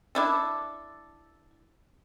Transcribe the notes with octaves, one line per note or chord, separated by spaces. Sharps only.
D4 E4 A4